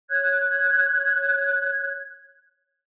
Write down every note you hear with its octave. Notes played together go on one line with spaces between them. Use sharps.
C#5 F#6 G#6